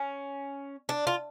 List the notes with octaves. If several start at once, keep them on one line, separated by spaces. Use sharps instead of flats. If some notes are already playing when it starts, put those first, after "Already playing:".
Already playing: C#4
D4
F4